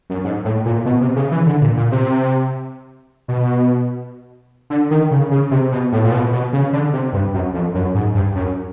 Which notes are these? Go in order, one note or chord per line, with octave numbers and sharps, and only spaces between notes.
F#2
G#2
A2
A#2
B2
C3
C#3
E3
D3
A#2
A#2
C3
B2
D3
D#3
C#3
C#3
C3
B2
A2
A#2
B2
B2
C#3
D3
C3
G2
F#2
F2
F#2
G#2
G2
F#2